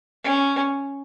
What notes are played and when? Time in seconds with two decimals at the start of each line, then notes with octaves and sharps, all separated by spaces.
0.24 C#4